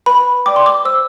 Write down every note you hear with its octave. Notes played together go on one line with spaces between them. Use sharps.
B4 B5
D5 G5 D6
C6
D6
C5 E6